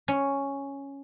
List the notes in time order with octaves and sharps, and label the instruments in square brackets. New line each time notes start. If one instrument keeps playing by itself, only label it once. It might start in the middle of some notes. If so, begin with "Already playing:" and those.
[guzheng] C#4